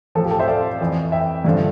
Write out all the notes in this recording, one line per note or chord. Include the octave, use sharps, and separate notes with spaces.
A2 F3 A4
G4
A4
C5 E5
D5 F5
F2 E3
E5 G5
G2 D3 F3